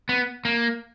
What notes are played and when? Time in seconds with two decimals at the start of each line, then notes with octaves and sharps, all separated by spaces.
0.09 B3
0.45 A#3